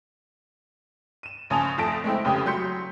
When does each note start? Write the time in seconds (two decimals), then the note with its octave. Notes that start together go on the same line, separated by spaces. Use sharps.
1.23 D#7 E7
1.50 A#1 C#3 G#5 A5 D#6 F7
1.78 F2 A3 A5 A#6 B6 D7
2.04 G#3 A3 C4 E4
2.25 F1 C#3 G4 D#6
2.46 F#3 C6 G6 B6 C#7